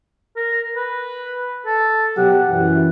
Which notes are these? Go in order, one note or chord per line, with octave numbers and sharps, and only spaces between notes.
A#4
B4
A4
B2 F#3 G4 F#5
F#2 E3